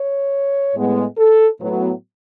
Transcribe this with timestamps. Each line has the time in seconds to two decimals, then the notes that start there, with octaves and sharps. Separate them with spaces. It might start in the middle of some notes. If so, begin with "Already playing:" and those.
Already playing: C#5
0.75 A2 G#3 B3
1.18 A4
1.61 A2 F#3 B3